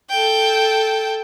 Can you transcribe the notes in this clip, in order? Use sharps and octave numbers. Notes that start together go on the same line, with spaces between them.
A4 G5